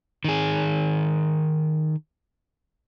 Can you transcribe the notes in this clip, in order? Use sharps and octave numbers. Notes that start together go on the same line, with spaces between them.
D#3 G#4